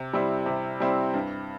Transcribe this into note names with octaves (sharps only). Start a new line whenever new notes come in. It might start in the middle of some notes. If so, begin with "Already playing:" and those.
Already playing: C3
G3 C4 E4
C3
G3 C4 E4
G2